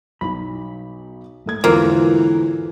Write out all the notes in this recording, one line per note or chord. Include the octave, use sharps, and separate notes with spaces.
B1 D#4 B5
G#2 A3 G#6
E2 G#2 D3 E3 A#3 F4 A4 C5